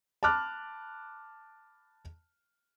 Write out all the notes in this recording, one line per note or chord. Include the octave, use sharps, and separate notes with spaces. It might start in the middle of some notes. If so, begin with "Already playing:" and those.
A5 B5 D6 F6 F#6